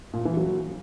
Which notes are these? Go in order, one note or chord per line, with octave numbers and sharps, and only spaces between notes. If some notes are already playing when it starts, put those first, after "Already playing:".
A#2
E3
F#3